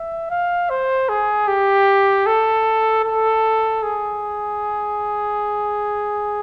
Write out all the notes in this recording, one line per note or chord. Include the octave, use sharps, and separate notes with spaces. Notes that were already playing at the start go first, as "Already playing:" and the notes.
Already playing: E5
F5
C5
G#4
G4
A4
A4
G#4